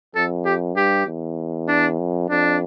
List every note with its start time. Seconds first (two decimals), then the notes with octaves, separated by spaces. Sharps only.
0.15 F2 A4
0.45 G4
0.76 G2 G4
1.06 E2
1.68 D4
1.99 F2
2.29 F2 D4